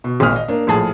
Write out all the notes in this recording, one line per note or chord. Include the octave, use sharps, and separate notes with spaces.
B2
G#1 A#2 D#6 F6
D#5
A#3 D4
A#1 A2 G#4 A5